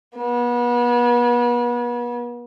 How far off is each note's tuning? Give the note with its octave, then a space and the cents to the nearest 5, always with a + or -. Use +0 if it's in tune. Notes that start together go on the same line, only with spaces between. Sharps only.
B3 -35